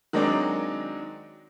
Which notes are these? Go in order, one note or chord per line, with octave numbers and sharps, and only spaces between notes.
D#3 F#3 G#3 C4 D4 D#4